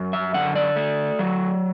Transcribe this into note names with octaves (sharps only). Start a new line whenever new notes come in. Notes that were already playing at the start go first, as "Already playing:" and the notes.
Already playing: F#2
E5
D3 F#5
D5
A3
F#3